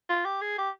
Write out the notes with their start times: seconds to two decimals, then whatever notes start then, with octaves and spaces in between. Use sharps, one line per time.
0.09 F4
0.25 G4
0.42 G#4
0.58 G4